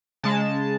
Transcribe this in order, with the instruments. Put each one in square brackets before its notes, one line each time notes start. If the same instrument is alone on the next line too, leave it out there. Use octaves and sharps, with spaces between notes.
[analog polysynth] C#3 G#3 A5